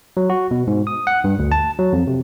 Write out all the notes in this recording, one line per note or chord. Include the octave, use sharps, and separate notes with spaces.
F#3
F#4
B2
G#2
D#6
F#5
G2
D2
A5
F#3
F2
C3